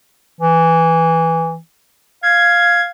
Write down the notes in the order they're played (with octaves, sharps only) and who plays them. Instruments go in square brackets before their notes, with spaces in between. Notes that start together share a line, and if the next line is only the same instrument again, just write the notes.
[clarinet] E3
[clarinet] F5 [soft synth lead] G#6